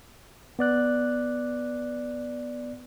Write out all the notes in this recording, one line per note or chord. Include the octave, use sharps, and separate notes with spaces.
B3 D5 F#6